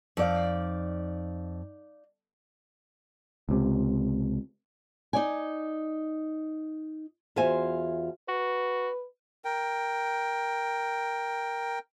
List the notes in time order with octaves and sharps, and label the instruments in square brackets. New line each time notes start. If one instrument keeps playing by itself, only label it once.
[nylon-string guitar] F2 [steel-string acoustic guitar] D#4 D5 F5
[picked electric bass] C#2 C3
[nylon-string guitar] D#4 D5 G#5
E2 F4 F#4 C5 E5 G#5
[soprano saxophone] F#4 [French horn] B4
[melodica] A#4 G5